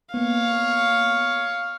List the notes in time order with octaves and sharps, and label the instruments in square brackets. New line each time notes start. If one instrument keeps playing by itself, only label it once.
[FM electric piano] A#3 B3 [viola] C#5 F5